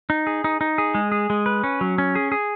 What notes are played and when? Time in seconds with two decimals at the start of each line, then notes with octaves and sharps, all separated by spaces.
0.10 D#4
0.27 G#4
0.44 D#4
0.61 D#4
0.78 G#4
0.95 G#3
1.12 G#4
1.30 G#3
1.46 B4
1.64 C#4
1.81 F#3
1.98 C#4
2.15 G#4
2.32 G#4